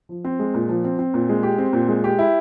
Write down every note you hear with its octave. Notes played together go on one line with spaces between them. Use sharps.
F3
C4
G#3
A#2
F3
C4
C4
A#2
G#3
G4
C4
A#2
G#3
G4
E4